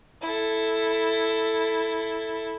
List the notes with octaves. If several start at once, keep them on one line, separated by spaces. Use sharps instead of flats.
E4 A4